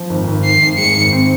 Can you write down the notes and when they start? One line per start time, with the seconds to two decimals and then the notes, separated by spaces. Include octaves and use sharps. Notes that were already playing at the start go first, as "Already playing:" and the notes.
Already playing: F3
0.09 G#1
0.27 G#1
0.44 G#1 C7
0.62 G#1
0.78 G#3 C#7
0.95 G#1
1.13 C4